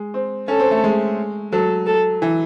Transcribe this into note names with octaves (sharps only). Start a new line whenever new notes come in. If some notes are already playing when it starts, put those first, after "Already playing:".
Already playing: G#3
C4
C#4 A4
C4
A3
G#3
F#3 A4
A4
E3